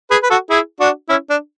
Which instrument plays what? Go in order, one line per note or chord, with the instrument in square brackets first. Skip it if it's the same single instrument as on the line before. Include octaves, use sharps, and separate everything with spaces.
[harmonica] G#4 B4
B4
F#4 A4
E4 G#4
D4 F#4
C#4 E4
D4